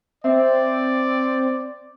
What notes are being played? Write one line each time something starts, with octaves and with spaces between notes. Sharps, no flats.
C4 D5 E5